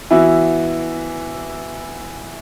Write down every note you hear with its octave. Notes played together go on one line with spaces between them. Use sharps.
E3 B3 E4 F#4